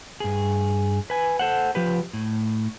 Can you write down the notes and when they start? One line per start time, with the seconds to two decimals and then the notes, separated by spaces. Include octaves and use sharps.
0.20 G2 G#4
1.10 B4 G#5
1.39 A4 C5 F#5
1.75 F3 G4 B4
2.13 A2